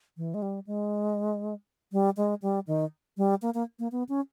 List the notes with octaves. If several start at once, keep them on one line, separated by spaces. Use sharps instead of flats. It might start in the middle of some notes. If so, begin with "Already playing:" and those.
E3
G#3
G3
G#3
G3
G#3
G3
D#3
G3
A#3
A#3
A#3
B3
C#4